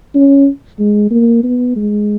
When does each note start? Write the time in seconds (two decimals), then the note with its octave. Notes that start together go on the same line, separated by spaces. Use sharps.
0.15 C#4
0.79 G#3
1.11 A#3
1.44 B3
1.76 G#3